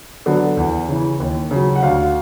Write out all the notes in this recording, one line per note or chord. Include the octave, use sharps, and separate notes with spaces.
D3 F#3 B3
E2
C#3 E3
D#2
C#3 F#3
F#5
D2 F5